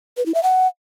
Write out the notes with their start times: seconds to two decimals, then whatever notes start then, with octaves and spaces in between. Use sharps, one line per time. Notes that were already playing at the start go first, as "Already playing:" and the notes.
0.17 B4
0.26 E4
0.35 E5
0.43 F#5